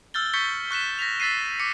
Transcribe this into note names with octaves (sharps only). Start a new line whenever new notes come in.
E6 F6 G6 A6 G7
C#6 G6 A6 B6 C#7 G7
C#6 F#6 B6 E7
A#6 B6 F7
E6 A6 B6 C7 D#7
D6 B6 C#7